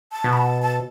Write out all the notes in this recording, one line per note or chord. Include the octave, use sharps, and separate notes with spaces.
A5
B2
B5
A5
A5